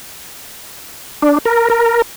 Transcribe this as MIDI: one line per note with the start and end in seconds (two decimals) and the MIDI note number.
1.22 1.38 62
1.45 1.70 70
1.70 2.02 70